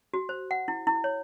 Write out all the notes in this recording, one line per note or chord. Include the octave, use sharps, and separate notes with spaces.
F#4
C5
F#5
E4
E4
C#5